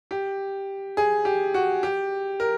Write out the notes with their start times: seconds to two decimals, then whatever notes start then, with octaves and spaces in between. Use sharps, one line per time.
0.11 G4
0.97 G#4
1.25 G4
1.54 F#4
1.83 G4
2.40 A#4